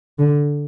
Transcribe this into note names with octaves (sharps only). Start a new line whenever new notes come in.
D3